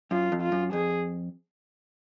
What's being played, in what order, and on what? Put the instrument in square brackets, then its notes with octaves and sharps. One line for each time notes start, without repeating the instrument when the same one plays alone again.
[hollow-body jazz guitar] F#2 [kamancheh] F4
[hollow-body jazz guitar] F2
[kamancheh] F4
[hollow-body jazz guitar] F#2
[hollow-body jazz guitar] F2 [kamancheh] G#4